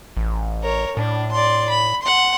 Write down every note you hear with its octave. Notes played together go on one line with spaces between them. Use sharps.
A1
A#4 C#5
A2 D4
D5 C6
B5
F#5 C6